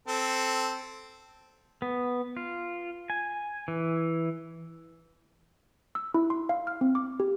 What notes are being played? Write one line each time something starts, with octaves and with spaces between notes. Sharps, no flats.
C4 A4
B3
F4
G#5
E3
E6
E4
C6
F5
F6
C4
D6
G4